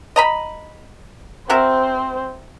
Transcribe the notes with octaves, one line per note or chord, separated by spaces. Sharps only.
D#5 A#5 B5
C4 F#4 A#4 C5 E5